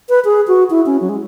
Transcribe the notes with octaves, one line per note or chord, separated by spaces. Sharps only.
B4
G#4
F#4
E4
C#4
F#3
G#3